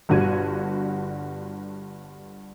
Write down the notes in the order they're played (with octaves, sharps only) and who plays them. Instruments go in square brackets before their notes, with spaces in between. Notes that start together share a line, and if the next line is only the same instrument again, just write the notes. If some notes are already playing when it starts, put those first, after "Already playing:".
[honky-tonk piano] G1 G2 D3 F#4 G#6 D#7